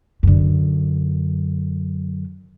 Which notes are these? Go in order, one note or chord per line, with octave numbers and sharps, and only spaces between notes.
F#2 D3